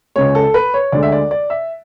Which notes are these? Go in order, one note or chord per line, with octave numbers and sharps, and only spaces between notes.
C#2 C#3 G#3 C#5
A4
B4
C#5
D2 D3 G#3 D5
E5
D5
D5
E5